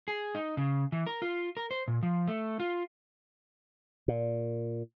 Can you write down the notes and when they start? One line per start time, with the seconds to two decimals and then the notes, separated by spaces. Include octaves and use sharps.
0.08 G#4
0.35 D#4
0.57 C#3
0.92 E3
1.06 A#4
1.22 F4
1.57 A#4
1.71 C5
1.88 A#2
2.03 F3
2.28 A3
2.60 F4
4.08 A#2